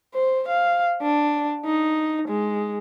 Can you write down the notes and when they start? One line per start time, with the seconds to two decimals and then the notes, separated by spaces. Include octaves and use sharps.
0.14 C5
0.49 F5
1.03 D4
1.66 D#4
2.29 G#3